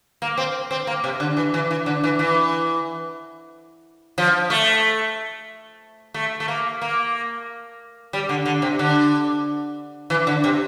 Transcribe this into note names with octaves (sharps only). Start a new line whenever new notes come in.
A#3
C4
C4
A#3
C3
D3
E3
E3
E3
D3
E3
E3
F3
A3
A3
A3
A#3
A#3
G3
D3
D3
C3
D3
E3
D3
C3